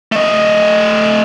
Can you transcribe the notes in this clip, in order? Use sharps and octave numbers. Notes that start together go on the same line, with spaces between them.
A3 D#5